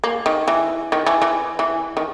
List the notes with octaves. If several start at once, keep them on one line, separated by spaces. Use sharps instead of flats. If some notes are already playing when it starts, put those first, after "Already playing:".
A#3
D#3
E3
D#3
E3
E3
E3
D#3